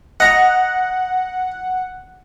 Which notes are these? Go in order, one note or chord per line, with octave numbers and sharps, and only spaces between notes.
D#5 F#5 A#5